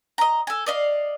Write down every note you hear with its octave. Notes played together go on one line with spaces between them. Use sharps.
D#5 A#5
A4 G#5
D5 D#5 F5